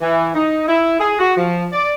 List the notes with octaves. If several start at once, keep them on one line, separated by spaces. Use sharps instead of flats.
E3
D#4
E4
G#4
F#4
F3
D5